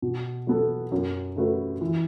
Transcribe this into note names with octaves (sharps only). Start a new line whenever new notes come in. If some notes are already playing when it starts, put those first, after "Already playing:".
B2
F#3 B3 A4
F#2
C#3 A3 F#4 B4
E3